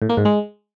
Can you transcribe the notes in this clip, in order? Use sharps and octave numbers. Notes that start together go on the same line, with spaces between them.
A2
A#3
G#2
G#3